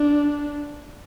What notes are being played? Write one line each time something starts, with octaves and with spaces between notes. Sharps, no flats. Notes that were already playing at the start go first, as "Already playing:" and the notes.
Already playing: D4